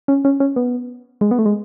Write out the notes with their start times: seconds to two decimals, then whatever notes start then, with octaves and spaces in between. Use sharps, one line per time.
0.08 C#4
0.25 C#4
0.40 C#4
0.56 B3
1.21 G#3
1.31 B3
1.39 A3
1.46 G#3